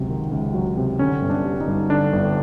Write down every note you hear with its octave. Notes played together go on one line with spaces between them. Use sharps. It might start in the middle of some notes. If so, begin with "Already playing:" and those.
Already playing: C#2 C3 F#3
D#3
C#2
F#3
C3
D3 C#4
G1
D4
G3
D#4
G2
D3 D4
G1